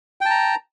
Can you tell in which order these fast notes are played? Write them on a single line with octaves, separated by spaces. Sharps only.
G5 A5 A#5